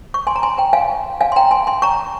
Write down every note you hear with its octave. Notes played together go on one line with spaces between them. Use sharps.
C#6
G#5 C6
A#5
G#5 C6
G5 A#5
F5 G#5
F5 G#5
C6
G5 A#5
G#5 C6
G#5 C6
A#5 C#6